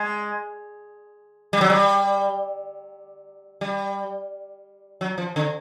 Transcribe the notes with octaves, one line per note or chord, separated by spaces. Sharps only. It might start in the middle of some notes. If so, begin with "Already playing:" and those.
Already playing: G#3
G3
F#3
G3
G3
F#3
F3
D3